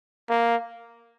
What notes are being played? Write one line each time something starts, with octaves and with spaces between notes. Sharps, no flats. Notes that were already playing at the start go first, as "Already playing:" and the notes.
A#3